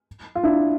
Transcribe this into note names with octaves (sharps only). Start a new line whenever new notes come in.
F4
D4 E4